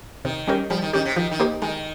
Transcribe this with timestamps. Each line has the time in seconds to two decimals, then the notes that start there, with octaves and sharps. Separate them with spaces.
0.25 C3 D#3
0.47 G3 C#4 G4 A#4
0.70 F3 G3
0.82 D#3
0.93 D#3 C#4 G4
1.05 C3
1.16 D#3 F3
1.31 D#3
1.39 A#3 D#4 G4 C5
1.62 D#3 G#3